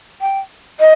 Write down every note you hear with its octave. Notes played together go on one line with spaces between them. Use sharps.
G5
D#5